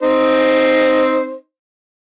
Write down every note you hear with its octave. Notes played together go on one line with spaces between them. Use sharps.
C4 D#4 C5